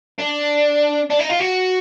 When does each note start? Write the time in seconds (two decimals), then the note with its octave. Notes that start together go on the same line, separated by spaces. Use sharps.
0.18 D4
1.10 D4
1.19 D#4
1.30 F4
1.40 F#4